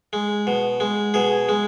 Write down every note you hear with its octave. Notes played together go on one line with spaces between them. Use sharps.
G#3
B2
G#3
B2 G#4
G#3